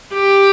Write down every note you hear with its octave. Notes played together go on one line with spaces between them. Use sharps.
G4